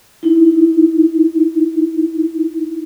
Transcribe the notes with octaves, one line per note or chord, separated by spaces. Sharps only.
D#4 E4